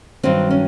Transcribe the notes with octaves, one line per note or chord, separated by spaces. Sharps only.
G2 D#3 F#3 C4
C#4